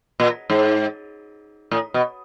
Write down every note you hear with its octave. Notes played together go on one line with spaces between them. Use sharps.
A#2
G#2
A2
B2